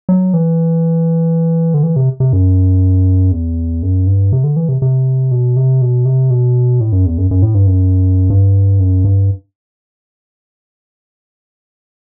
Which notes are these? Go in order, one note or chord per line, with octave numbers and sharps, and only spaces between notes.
F#3
E3
D3
E3
C3
C3
F#2
E2
F#2
G2
C3
D3
E3
C3
C3
B2
C3
B2
C3
B2
A2
F#2
E2
F#2
F#2
A2
G2
F#2
G2
F#2
G2